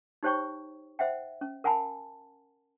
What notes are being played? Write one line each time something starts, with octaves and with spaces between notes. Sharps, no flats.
D#4 G4 C5 C#5 G5 C#6
C5 E5 F#5 G5
C#4
A#4 F#5 G#5 A5 B5